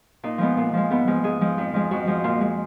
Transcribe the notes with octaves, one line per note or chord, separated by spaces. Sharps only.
A#2 D#4
F3 G#3 B3
A#2
F3 G#3
G#2 B3
F3 G#3
G#2 G#4
F3 G#3
F2
F3 G#3
F2 F#4
F3 G#3
A#2 F4
G#3